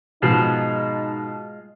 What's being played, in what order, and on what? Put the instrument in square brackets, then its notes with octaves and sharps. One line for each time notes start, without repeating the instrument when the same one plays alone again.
[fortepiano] G#2 B2 F3 [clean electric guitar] G#3 F4 C5 [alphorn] D#4